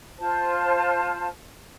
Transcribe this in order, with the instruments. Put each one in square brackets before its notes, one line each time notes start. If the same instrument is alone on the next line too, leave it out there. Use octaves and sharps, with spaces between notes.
[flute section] F4 C5 A5